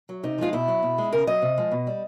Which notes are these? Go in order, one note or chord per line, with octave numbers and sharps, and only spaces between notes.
F#3
C3 D#4
F3 G#3 F4
B2 E4
F#3
B2
G#3
C#3 A#4
F#3 D#5
C3
F3 G#3
B2
G3